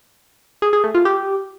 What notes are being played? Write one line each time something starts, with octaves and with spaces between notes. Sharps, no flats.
G#4
G#4
A3
F4
G4